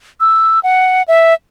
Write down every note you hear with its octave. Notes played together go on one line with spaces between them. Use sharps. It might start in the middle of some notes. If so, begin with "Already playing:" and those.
E6
F#5
E5